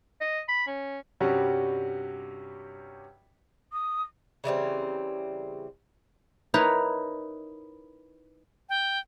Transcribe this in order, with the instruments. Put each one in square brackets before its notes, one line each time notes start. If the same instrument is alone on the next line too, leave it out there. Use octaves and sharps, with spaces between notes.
[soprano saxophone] D#5
B5
C#4
[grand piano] G2 C3 G3 C#4 F#4
[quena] D#6
[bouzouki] C#3 E3 G3 C4
[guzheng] D#4 E4 A#4 B4 C#5
[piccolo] G5